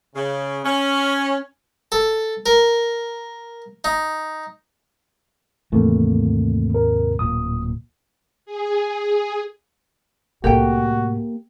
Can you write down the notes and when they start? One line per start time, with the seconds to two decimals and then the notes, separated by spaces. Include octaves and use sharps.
0.15 C#3
0.64 C#4
1.92 A4
2.46 A#4
3.84 D#4
5.72 D#2 G#2 C3 E3 A3 A#3
6.74 A#4
7.19 D1 A#2 D#6
8.46 G#4
10.44 C2 A2 A#3 F#4 G4 A4 G5